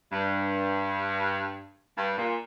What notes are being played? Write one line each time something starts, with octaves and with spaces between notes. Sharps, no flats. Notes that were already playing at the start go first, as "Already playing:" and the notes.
G2
G2
A#2